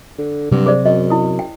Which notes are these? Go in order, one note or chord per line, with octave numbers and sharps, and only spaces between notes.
D3
G2 C3 F#3 C4
G#4 C5 D5
F#2 D#5
E4 D#6
G5